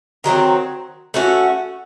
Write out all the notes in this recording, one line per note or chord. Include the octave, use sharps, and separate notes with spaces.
D#3 F#3 A3 C4
A3 C#4 F#4